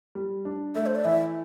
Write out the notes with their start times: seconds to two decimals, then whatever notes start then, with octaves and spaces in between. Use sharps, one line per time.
0.15 G3
0.45 D4
0.75 A3 E5
0.86 C5
0.95 D5
1.05 E3 E5